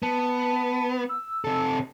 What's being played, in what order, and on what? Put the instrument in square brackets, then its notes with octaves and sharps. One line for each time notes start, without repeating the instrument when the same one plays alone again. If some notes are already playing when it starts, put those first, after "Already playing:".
[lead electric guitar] B3 [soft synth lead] A5
[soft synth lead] E6
[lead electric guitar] C3 A4